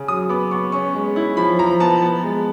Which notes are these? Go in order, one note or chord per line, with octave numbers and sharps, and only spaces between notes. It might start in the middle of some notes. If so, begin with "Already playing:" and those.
Already playing: C#3
F#3 D#6
B3 D6
B3 C#6
C#4 C#6
G#3
E4
F3 B5
F3 A#5
B3 A5
B3
G#3